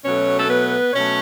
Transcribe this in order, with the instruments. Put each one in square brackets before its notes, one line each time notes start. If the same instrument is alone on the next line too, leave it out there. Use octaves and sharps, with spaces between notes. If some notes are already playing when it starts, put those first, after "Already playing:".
[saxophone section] B2 F#3 A3 C#4 C#5
A4
B3 B4
B2 F#3 A3 C#4 C#5